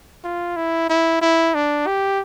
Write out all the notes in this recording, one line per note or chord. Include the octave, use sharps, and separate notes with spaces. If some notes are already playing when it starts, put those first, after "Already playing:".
F4
E4
E4
E4
D4
G4